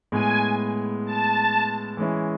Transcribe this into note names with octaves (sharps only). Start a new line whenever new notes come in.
A2 G#3 B3 G#5
A5
E3 G#3 C#4 E4